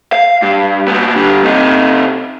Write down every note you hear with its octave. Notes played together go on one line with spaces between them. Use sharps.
F5
G2
A#2 B3
D3 G3
C3 D#4